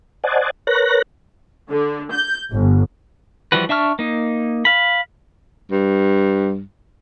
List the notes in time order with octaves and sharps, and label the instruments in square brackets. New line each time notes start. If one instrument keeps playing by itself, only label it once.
[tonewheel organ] C5 D5 D#5 F#5 G#5 A5
A#4 B4 C#5 F#6 A#6
[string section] D3
G6
G1
[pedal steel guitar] E3 F3 G3 F#4 B4
D4 E5 A5 C#6 F6
A#3 D#4
F5 B5
[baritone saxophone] G2